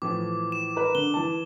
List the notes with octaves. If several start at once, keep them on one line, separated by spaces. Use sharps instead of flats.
A2 E3 F3 D6
E7
A#4 B4
D3 G7
E3 A5